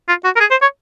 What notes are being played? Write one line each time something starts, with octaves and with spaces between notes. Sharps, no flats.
F4
F#4
A#4
G#4
C5
C#5